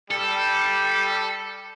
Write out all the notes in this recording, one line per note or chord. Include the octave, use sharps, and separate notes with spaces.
G3 A4